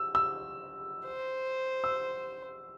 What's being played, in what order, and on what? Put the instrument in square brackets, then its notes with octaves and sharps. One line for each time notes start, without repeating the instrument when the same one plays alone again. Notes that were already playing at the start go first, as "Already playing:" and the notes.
Already playing: [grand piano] E6
E6
[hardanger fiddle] C5
[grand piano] E6